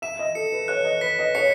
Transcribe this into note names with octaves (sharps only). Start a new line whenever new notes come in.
E5 E7
D#5
A4 C#7
B4
C#5 F#6
D#5
B4 B6
D#5
C#5 C#7